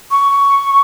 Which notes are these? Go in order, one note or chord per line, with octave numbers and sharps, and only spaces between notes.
C#6